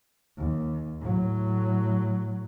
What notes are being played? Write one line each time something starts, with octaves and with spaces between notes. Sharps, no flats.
D#2
A2 F#3